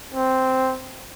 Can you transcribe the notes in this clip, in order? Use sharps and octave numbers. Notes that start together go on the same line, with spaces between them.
C4